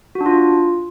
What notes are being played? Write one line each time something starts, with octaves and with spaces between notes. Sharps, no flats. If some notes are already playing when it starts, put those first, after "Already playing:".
F#4
D4
F4